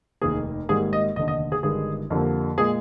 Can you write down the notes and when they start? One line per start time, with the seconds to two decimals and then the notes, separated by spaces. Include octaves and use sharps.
0.21 F1 D#2 D#3 A#3 G#4
0.69 G#1 G#2 G3 A#3 G#4
0.93 D#5
1.16 F1 D#2 D3 D#5
1.28 D#5
1.52 G#4
1.63 G1 G2 D#3 G#3 G#4
2.10 F2 D3 G3 A#3
2.58 A#2 G#3 G#4